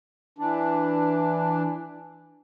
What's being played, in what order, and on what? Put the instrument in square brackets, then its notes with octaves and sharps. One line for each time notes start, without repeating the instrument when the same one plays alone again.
[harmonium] E3 D4